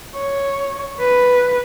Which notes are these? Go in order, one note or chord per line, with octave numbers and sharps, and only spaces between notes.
C#5
B4